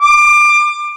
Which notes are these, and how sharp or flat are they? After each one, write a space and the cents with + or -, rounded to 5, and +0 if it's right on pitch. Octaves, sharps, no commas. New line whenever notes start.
D6 +25